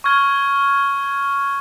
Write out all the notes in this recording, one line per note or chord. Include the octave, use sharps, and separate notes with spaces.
C#6 F6 G#6